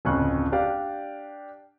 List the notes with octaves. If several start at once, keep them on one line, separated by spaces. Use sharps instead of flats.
D1 F2 C#3 C4 C#6 F#6
D4 G4 D5 F5